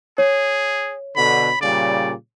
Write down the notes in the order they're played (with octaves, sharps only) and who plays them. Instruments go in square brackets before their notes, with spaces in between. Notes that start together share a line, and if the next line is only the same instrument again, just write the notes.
[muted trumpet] G#4 [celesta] C#5
[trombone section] B2 D3 [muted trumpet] B5
[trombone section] A#2 C#3 G3 [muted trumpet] D5